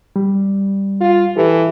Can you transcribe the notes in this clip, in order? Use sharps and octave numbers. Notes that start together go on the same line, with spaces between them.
G3
F4
E3 G4 A4